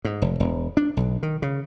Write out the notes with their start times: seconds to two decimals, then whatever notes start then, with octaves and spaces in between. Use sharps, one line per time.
0.05 G#2
0.22 F1
0.40 E1
0.77 D4
0.97 B1
1.23 D#3
1.42 C#3